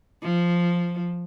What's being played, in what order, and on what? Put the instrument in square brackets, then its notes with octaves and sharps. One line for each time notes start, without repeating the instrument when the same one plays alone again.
[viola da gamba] F3